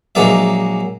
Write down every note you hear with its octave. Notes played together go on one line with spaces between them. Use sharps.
A#1 F#3 G#3 A#3 D5 E5